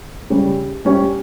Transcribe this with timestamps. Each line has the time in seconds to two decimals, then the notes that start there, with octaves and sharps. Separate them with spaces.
0.30 C#3 G3 C#4
0.85 G3 C#4 G4 C#5